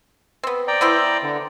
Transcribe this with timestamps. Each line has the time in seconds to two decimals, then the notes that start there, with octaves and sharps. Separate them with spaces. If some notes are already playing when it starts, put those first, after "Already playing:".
0.43 B3 C4
0.68 D5 G5 A#5
0.81 B3 E4 C5
1.23 D3